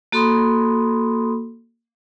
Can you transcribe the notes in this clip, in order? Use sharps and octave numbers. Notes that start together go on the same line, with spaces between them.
A#3 F#4 A4 B5 C6 D#6